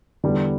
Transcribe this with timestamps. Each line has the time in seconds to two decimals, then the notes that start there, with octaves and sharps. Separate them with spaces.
0.24 E2 D3 G3 B3